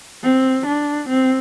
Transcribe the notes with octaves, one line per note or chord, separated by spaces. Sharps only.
C4
D4
C4